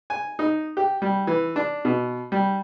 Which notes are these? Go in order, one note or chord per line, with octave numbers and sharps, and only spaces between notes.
G#5
D#4
G4
G3
E3
D4
B2
G3